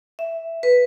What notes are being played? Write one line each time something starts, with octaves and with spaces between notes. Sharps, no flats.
E5
B4